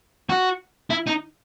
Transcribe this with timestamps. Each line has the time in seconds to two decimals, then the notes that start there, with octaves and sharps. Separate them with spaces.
0.30 F#4
0.91 E4
1.07 D#4